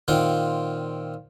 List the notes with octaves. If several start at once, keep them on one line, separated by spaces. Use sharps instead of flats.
A#2 D#3 C4 F4 F#5 C6